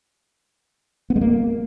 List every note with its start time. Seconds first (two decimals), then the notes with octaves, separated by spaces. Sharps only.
1.10 B3
1.16 G#3
1.21 A#3